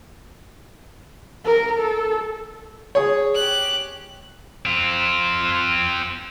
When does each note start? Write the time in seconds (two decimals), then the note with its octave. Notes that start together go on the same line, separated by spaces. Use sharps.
1.45 A#4
1.80 A4
2.95 G#4 C#5
3.35 G4 F#6
4.66 C4 F4